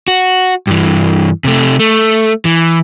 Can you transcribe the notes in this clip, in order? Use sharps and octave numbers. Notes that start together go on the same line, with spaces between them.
F#4
G2 E3
C3 A3
A3
E3